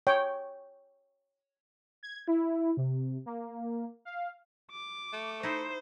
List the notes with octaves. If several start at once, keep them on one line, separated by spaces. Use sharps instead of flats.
C#5 G5
G#6
E4
C3
A#3
F5
D6
A3
D#4 E4 C5